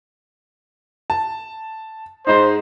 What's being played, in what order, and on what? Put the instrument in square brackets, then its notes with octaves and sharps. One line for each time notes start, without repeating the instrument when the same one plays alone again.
[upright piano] A5
[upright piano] G#2 D#4 [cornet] C5